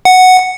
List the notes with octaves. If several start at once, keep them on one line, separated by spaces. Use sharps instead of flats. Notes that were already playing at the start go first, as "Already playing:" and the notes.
F#5